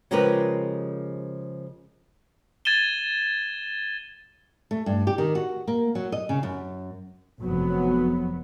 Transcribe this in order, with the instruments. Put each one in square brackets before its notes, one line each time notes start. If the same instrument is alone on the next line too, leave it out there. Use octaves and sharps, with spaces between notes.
[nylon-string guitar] C#3 F3 G#3 G4 A#4 B4
[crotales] G#6 A6 D#7 E7 G7
[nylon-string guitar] A3
G2
G4
D#3
F#4
A#3
F#3
D#5
C#3
F#2
[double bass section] F1 F#3 B3